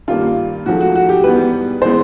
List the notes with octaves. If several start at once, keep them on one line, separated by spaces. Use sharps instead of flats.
G2 D#3 G3 A#3 F4
G#2 F3 A3 F#4
F#4
F#4
G4
G#2 E3 G3 B3 B4
E3 G#3 B3 C5